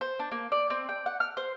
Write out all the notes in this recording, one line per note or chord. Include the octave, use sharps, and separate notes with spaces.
C5
D4
A#3
D5
C4
G5
F#5
F6
C5